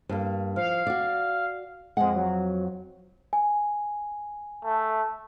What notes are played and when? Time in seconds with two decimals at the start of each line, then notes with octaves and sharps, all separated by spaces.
0.09 G2 A#3
0.56 F3 F5
0.87 F#4 D5
1.97 F2 G#3 F#5
2.15 F#3
3.33 G#5
4.64 A3